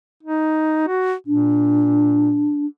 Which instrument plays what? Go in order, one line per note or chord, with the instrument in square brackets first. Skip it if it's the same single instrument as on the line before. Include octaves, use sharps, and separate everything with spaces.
[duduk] D#4
F#4
[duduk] A#2 [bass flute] D4